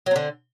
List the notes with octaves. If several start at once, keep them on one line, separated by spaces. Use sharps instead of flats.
D3 F#3 C4